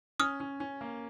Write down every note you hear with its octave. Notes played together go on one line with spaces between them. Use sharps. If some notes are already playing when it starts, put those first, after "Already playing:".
C#4 D#6 F6
C#4
C#4
A#3